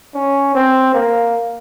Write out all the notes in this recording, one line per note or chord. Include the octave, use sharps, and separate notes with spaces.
C#4
C4
A#3